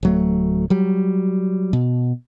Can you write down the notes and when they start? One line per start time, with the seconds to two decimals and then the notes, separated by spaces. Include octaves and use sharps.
0.03 D1 F#3 A3
0.70 F#3 G3
1.73 B2